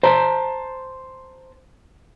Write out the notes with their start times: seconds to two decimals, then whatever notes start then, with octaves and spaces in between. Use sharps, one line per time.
0.03 C5 A5 A#5